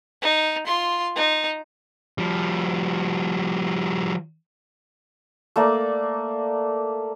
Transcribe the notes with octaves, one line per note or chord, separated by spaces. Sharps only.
D#4
F4 C6
D#4
F3 G3
A3 A#3 D5